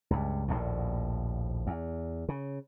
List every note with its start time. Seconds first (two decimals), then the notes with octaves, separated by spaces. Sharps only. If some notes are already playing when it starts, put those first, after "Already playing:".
0.10 C#2 G2
0.48 A#1 D#2 A2
1.67 E2
2.29 C#3